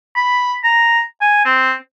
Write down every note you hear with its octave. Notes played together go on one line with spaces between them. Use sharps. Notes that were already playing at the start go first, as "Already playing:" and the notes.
B5
A#5
G#5
C4